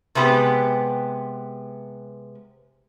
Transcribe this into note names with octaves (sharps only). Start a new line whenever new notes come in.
C3 G#3 B3 G4